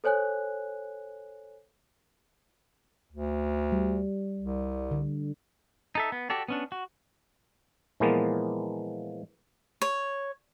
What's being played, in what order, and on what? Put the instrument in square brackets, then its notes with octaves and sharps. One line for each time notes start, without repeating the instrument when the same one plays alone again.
[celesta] A4 C5 C#5 G#5 F#6
[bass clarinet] D2
[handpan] G3
[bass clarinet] C2
[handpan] D3
[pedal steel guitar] D#4 A4 E5
B3
F#4 G4 A4 D5
B3 C#4 D4
F#4
[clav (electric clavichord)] A#2 E3 F3 G#3 A#3 B3
[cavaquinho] C#5